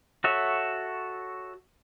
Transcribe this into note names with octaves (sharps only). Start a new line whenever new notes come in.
F#4 A4 C#5 E5